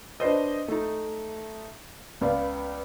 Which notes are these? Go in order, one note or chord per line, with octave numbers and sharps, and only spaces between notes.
D4 B4 C5 D#5
A3 D#4
C#2 B3 D5 F5